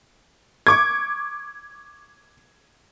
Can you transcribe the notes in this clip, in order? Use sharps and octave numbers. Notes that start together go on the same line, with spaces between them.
C#6 D6 G#6